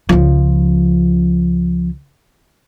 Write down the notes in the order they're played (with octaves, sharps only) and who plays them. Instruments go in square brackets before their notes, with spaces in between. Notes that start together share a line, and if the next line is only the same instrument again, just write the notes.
[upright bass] C#2 F3